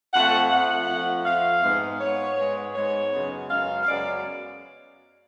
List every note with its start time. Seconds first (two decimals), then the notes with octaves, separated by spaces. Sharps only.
0.13 F2 F3 A3 F#5
0.50 F2 F3 A3 F#5
0.88 F2 F3 A3
1.25 F2 F3 A3 F5
1.63 G#2 G#3 B3
2.00 G#2 G#3 B3 C#5
2.38 G#2 G#3 B3
2.75 G#2 G#3 B3 C#5
3.13 F#2 C#3 G#3 B3
3.50 F#2 C#3 G#3 B3 F5
3.83 F5
3.87 F#2 C#3 G#3 B3 D5